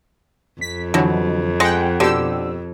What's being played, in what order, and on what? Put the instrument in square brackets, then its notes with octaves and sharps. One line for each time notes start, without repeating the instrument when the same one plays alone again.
[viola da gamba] F2 [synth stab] B6
[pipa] B2 [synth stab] D3 E3 F#3
[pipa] G#3 [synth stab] F#5 G5
[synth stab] B2 G4 E6 [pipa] D3